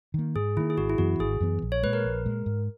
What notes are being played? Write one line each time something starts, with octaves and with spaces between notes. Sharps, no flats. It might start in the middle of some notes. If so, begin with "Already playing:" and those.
D#3 A#3
G#2 G#4
D#3 A#3 E4
G#4
G#1 F#4
E4
F#2 E3 B3 F#4
G#1 G#4
F#2 E3 B3
A#1
C#5
A#2 G#3 B4
A#4
A#1
A#2 G#3
G#2